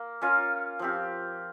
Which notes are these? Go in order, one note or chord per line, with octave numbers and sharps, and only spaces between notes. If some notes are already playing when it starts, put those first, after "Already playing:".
Already playing: A#3
C#4 F4 A#4
F3 C4 G4